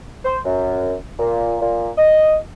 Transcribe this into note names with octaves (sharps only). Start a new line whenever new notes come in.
C5
F#2
A#2
A#2
D#5